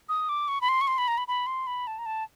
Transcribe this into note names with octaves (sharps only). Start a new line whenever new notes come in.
D#6
D6
C#6
B5
C6
C#6
C6
B5
A#5
B5
B5
C6
B5
A5
A#5
A5